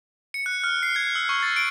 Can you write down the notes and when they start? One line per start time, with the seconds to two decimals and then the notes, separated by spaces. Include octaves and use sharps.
0.34 C#7
0.46 F#6
0.64 F6
0.83 C7
0.96 G#6
1.15 E6
1.29 C#6
1.42 A6
1.56 D7